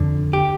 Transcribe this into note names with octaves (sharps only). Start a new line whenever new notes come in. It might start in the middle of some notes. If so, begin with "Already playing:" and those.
Already playing: F2 D3
G4